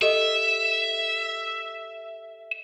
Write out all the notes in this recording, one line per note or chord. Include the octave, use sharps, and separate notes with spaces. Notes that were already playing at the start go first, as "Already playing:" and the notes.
G4 A4 D#5 E5